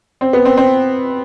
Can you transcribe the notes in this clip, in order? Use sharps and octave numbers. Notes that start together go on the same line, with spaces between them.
C4
B3
C4
C4